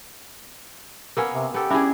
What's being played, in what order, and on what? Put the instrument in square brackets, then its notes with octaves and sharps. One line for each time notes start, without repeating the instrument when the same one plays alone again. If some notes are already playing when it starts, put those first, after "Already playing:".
[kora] A#3 B3 C#4 [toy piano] A#4 D6 E6
[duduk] C3
[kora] B3 A4 [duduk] G4
[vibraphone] C#4 [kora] D4 E4 G#4 [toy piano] E5 B5 D6